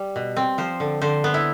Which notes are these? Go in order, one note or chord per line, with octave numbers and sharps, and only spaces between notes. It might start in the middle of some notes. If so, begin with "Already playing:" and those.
Already playing: G3
B2
C4
F3 C5
D3
D3 C5
B3
E4